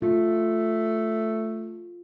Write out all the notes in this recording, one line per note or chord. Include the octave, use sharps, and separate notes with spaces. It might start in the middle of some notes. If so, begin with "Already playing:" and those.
A3 F4